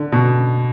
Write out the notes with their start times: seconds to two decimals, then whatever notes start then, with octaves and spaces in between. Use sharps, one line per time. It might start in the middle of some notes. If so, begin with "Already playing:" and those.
Already playing: D3
0.12 B2